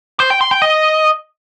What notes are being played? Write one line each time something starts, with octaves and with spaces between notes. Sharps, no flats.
C5
G5
C6
G5
D#5